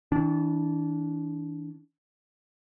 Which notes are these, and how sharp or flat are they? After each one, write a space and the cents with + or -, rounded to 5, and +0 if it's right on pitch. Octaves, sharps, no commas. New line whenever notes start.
E3 -45 D4 -20